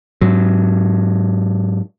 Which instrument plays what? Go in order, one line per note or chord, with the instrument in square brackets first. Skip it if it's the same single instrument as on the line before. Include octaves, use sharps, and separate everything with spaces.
[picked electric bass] G#2 F#3